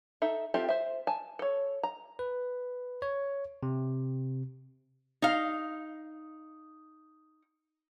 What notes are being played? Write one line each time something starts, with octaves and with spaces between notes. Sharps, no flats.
D#4 A4 E5
C4 F4 G4 A4 E5
C5 E5
G#5 A5
A4 C#5
A#5
B4
C#5
C3
D#4 F5